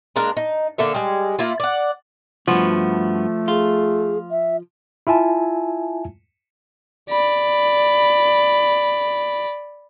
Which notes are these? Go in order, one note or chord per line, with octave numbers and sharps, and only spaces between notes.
G#3 A#3 D4 A#4
D#4
D3 A#3 A4 E5
G3 G#3
A#3 E4 F4
D5 F#5
G2 F3 A3 B3 F#4
F4 G#4
E5
E4 F4 E5 G#5 A5
D5 B5